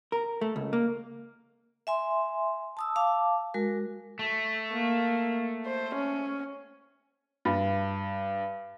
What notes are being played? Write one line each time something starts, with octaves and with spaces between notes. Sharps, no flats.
A#4
A3
C#2
A#3
E5 G#5 C6
A5 D#6 E6
F5 A5 D6
G#3 F#4 A#4
A3
A#3
C5
C#4
G2